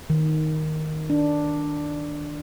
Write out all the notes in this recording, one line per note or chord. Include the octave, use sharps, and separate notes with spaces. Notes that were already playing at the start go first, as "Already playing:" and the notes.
D#3
D4